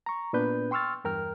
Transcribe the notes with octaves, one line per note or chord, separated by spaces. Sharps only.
A#5 C#6
A#2 B3 D4 B4 G6
G5 C6 C#6 E6 F6 A6
E2 G2 A#4 G5 F6